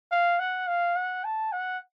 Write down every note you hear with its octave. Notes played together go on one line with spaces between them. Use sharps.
F5
F#5
F5
F#5
A5
F#5